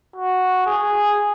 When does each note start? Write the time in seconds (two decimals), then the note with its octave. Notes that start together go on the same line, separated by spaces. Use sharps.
0.16 F#4
0.66 G#4